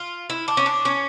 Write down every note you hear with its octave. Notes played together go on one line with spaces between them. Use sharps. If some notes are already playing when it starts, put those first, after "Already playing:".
Already playing: F4
E4
D4
C#4
D4
C#4